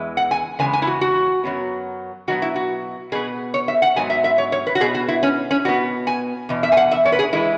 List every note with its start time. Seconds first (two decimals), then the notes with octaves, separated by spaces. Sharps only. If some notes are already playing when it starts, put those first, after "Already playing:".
Already playing: E2 E3 G#3
0.17 F#5
0.31 G#5
0.59 E2 C#3 G#3 B3 G#5
0.73 G#5
0.82 E4
0.87 F#4
1.01 F#4
1.44 F#2 F#3 B3
2.28 B2 F#3 B3 F#4
2.42 E4
2.56 F#4
3.12 B2 B3 G#4
3.54 C#5
3.68 E5
3.82 F#5
3.96 G#2 F#3 B3 G#5
4.10 E5
4.24 E5
4.38 C#5
4.52 C#5
4.67 B4
4.75 F#4
4.80 B2 B3 G#4
4.95 F#4
5.08 E4
5.23 C#4
5.51 C#4
5.65 B2 B3 F#4
6.07 G#5
6.49 E2 B2
6.63 E5
6.72 G#5
6.77 F#5
6.91 E5
7.05 C#5
7.12 B4
7.19 G#4
7.33 E3 G#3 E4